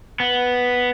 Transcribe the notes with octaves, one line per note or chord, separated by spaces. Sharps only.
B3